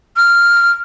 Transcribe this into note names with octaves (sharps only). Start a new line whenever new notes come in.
F6